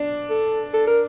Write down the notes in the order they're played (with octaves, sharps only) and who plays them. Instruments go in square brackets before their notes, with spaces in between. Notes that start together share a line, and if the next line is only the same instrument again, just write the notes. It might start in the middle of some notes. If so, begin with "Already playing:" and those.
Already playing: [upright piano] D4
[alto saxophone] A4
A4
A#4